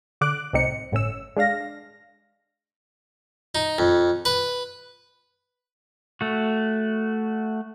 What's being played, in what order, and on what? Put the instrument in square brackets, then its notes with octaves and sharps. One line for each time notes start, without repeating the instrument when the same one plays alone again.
[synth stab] D3 D6 F#6
C2 A2 C4 D#4 C#7
G1 A2 C#4 E6
G#3 D4 F5 A#6
[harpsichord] D#4
F2
B4
[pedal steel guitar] A3 F#4